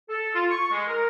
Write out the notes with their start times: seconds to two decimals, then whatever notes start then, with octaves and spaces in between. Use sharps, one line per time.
0.09 A4
0.34 F4
0.49 C#6
0.71 G#3
0.88 A#4